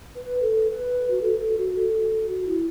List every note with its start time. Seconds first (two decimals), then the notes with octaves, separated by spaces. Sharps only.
0.15 B4
0.42 A4
0.69 B4
1.10 F#4
1.22 A4
1.39 A4
1.57 F#4
1.76 A4
2.29 F#4
2.47 E4